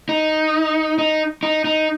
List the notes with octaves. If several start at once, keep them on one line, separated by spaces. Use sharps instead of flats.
D#4
D#4
D#4
D#4